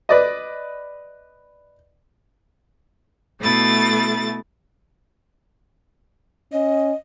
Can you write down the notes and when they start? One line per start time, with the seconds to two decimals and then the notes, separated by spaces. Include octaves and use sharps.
0.09 B4 D5 D#5
3.40 B2 A3 E4 A6
6.53 C#4 D#5